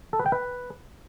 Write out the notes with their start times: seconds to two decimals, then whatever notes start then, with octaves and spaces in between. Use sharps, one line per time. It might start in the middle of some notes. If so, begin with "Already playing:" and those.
0.13 A4
0.19 B4
0.26 G5
0.32 B4